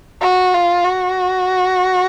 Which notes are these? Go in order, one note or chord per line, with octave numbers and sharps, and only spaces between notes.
F#4
F4
F#4